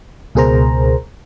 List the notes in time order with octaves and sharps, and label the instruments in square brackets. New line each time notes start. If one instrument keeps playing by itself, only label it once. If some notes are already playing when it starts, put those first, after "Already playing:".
[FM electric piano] C#2 B2 G#4 A#4 C5 A#5